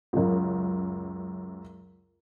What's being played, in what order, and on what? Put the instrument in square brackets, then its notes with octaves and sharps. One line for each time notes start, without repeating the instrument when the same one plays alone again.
[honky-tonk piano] C#2 F#2